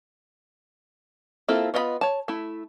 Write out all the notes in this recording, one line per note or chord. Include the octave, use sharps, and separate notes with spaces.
A#3 C4 E4 F4 A4
B3 F4 D#5 G5 B5
C#5 A5
A3 E4